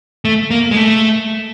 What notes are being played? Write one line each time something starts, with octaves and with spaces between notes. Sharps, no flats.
A3
A#3
G#3
A3